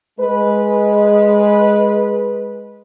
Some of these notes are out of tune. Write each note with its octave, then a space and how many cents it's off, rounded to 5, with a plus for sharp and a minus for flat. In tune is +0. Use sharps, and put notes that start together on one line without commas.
G#3 +0 B4 -15